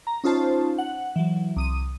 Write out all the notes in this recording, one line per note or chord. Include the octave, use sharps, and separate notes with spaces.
A#5
C#4 D#4 F4 C5 A5
F#5
E3 F#3
C2 D#6 D#7